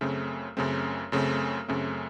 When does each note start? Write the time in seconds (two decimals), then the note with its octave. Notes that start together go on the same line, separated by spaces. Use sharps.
0.01 F#2 C#3 A3 C4
0.57 F#2 C#3 A3 C4
1.12 F#2 C#3 A3 C4
1.68 F#2 C#3 A3 C4